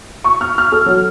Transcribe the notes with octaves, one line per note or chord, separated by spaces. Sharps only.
C#6
F6
F6
A4
F#3